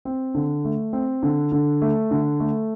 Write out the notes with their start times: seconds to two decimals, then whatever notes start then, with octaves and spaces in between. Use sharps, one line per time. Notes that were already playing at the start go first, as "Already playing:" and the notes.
0.05 C4
0.34 D3
0.64 A3
0.93 C4
1.23 D3
1.52 D3
1.81 A3
2.11 D3
2.40 A3